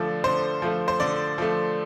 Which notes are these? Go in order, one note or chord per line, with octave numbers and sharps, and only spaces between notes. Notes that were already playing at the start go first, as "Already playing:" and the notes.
Already playing: D3 F3 A3 D5
D3 C5
F3 A3
C5
D3 D5
F3 A3